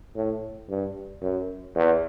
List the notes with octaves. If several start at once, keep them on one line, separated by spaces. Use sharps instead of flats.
A2
G2
F#2
E2